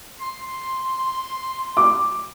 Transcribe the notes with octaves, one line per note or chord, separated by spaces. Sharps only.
C6
D6